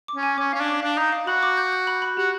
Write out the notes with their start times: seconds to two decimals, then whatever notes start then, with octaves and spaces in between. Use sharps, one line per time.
0.08 D6
0.16 C#4
0.23 G#5
0.38 C#4 D6
0.53 C#4 F5
0.61 D4
0.68 D6
0.83 D4 F5
0.98 D#4 A#5
1.12 F5
1.27 F#4 B5
1.43 D6
1.57 G6
1.72 G6
1.87 B5
2.02 B5
2.17 F#4 G4